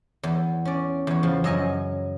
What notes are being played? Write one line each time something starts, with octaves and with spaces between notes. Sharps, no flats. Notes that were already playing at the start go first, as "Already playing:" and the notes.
E2
C#4 D5
E2 C#5
C#3 F3
F#2 D#5 G#5